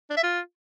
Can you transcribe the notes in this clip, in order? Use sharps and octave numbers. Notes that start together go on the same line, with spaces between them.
D4
E5
F4